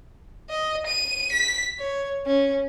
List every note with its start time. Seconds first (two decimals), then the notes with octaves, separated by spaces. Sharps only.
0.50 D#5
0.87 D#7
1.32 B6
1.79 C#5
2.26 C#4